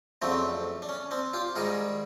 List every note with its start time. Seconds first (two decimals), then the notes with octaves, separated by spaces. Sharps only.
0.22 F2 C#3 F#3 A3 C4 D4
0.82 D4
0.89 C#4
1.11 C4 D4
1.33 F4 G4
1.56 G#2 D#3 G3 G#4 A#4